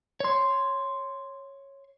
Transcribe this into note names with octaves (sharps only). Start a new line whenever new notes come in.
C#5 C6